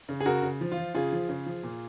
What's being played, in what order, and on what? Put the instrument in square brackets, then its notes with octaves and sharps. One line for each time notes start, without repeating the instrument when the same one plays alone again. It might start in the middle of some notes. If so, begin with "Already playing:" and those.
[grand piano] C#3
G#4
C#3 F#4 A#4
C#3
F3
F4
F3
C#3 F4 G#4
F3
C#3
F3
A#2